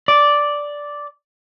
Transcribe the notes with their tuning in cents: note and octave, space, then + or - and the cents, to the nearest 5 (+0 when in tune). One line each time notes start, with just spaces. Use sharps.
D5 -5